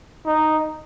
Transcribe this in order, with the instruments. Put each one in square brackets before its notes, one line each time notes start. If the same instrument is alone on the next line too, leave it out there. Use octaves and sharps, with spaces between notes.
[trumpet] D#4